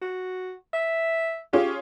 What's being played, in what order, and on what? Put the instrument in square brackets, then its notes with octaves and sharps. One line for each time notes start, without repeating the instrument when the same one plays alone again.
[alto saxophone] F#4
E5
[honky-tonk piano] C#4 F4 G#4 [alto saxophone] G4